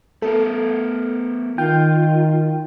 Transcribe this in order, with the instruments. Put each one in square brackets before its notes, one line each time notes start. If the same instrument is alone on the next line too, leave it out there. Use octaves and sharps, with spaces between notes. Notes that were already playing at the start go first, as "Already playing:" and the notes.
[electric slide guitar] A3 B3 A#4 [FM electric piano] A4
[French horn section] D#3 [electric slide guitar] F4 [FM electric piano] G5